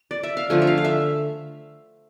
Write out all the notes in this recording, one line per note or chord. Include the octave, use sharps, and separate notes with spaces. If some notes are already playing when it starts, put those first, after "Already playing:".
Already playing: C5
D5
E5
F5
D3 F3 A3 G#5
E5
F5
F5
E5